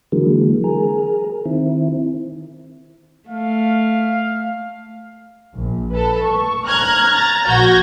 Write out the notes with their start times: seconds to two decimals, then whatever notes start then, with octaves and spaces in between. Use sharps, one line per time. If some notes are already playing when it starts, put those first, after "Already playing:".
0.12 D3 E3 F#3 G#3 A#3
0.64 G#4 A#4
1.46 D#3 C4 E4
3.29 A3 F5
5.54 A#1
5.91 A4 B4
6.21 C#6
6.65 A#5 F6 F#6 G#6
7.11 A#5 A6
7.47 A#1 F#4 G6 G#6 A#6